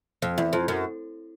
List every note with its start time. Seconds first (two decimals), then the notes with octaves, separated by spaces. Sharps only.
0.22 F2
0.38 E2
0.53 F2
0.68 F#2